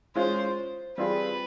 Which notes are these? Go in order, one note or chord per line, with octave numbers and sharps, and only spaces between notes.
G#3 C#4 F4 G#4 C5
G3 C4 F4 G#4 B4